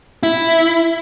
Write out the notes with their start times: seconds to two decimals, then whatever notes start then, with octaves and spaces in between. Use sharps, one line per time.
0.23 E4